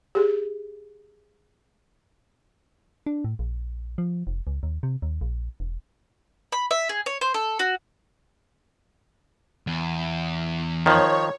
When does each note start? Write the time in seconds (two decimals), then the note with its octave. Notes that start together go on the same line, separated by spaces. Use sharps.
0.15 G4 G#4
3.06 D4
3.24 A2
3.39 A#1
3.98 F3
4.27 F1
4.47 C#2
4.63 D#2
4.83 C3
5.02 D#2
5.21 A#1
5.60 E1
6.52 B5
6.71 E5
6.89 G#4
7.06 C#5
7.21 C5
7.34 A4
7.59 F#4
9.67 E2
10.86 D#3 F3 C#5